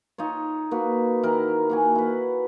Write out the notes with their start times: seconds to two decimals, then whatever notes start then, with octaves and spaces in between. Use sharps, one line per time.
0.18 D#4 F4 C#5
0.71 A#3 F#4 B4
1.23 D#3 E4 A#4
1.70 A#3 F#4 G#5
1.95 E4 B4